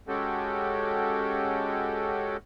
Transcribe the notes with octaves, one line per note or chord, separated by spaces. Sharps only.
G#3 C#4 F#4 G4 A4